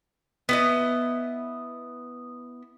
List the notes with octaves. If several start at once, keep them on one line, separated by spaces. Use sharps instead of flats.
B3 E4 D#5